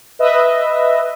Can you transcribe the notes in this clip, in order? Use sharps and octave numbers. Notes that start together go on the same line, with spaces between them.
B4 D#5 E5